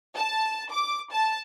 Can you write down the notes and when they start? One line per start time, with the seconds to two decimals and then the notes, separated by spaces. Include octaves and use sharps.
0.16 A5
0.71 D6
1.11 A5